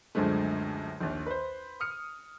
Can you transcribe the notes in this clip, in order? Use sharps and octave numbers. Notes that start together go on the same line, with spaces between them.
C#2 F#2 D3 F3 G#3 A3
A#1 D#2
B4 C5
D#6 F6 C#7